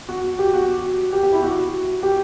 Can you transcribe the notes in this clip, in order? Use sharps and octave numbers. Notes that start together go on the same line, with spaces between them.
F#4
G4
F#4
G4
G4
E4
F#4
G4